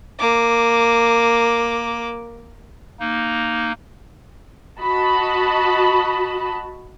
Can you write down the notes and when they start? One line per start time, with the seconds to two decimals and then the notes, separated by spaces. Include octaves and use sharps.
0.19 A#3 D6
3.00 A#3 D#4
4.81 F#4 D#5 A5 B5